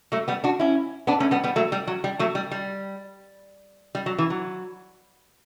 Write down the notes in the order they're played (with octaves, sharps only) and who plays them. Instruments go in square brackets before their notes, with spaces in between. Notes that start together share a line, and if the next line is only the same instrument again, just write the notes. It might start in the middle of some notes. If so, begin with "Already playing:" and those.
[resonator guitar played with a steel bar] F#3 A3
G3 B3
D4 F#4
C#4 E4
B3 D4
A3 C#4
G3 B3
G3 B3
F#3 A3
G3
F#3
G3
F#3 A3
G3
G3
G3
F#3
E3
F#3